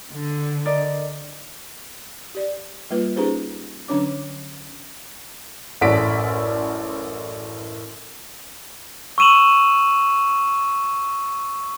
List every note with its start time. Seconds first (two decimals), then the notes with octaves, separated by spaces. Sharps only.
0.12 D3
0.65 A#4 D5 D#5
2.35 G4 D5
2.90 G3 A#3 F4 B4
3.16 C#4 D#4 G4 G#4 B4 C5
3.88 D3 F#3 C#4 D4 C#5 D6
5.81 A1 F#2 A4 D5 B6 D7
9.18 C#6 E6 D#7 E7 F#7